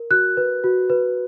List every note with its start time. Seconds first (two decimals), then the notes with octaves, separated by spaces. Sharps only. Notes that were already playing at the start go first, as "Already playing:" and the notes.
Already playing: A#4
0.11 F#4 F#6
0.37 B4
0.64 F#4
0.90 B4